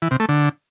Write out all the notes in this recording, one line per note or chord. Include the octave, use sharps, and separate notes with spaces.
E3
C3
A3
D3